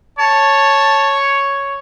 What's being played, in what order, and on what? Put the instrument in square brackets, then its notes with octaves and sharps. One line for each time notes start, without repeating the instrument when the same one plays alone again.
[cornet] C#5 [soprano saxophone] A5